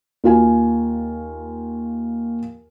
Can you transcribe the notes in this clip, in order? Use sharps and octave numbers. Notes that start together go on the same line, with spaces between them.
D#2 F4 G#5